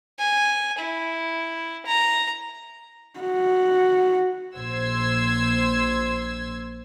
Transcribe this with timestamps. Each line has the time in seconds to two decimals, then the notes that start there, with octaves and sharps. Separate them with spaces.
0.19 G#5
0.78 E4
1.86 A#5
3.20 F#4
4.57 A#1 C5 C6 E6 G#6